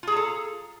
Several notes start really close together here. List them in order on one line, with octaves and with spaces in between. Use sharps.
F4 G#4 A#5 A4